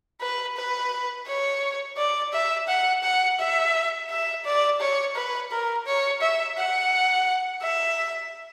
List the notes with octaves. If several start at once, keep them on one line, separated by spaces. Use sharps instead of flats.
B4
B4
C#5
D5
E5
F#5
F#5
E5
E5
D5
C#5
B4
A#4
C#5
E5
F#5
E5